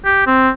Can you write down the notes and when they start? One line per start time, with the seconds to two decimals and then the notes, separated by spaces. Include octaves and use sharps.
0.05 G4
0.27 C4